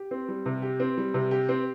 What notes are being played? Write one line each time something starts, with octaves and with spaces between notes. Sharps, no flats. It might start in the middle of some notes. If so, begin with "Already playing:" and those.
Already playing: G4
C4
G3
C3
G4
C4
G3
C3
G4
C4